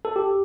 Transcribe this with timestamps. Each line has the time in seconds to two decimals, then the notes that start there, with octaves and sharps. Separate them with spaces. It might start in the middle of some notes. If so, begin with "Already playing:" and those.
0.05 A4
0.16 G4